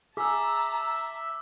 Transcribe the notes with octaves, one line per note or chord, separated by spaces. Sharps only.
G#4 E5 A5 A#5 D6 E6